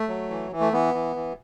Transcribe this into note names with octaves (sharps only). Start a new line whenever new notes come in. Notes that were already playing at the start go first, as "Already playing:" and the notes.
Already playing: A3
F#3
E3
E3
A3
E3 B3
E3
E3